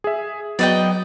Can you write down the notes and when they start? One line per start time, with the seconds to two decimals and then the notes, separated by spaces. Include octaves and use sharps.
0.04 G#4 E5
0.59 F#3 B3 D5 D#5 G5